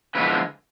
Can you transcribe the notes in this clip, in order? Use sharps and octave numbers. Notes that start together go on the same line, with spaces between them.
D3 F3 G#3 B3 E4 B4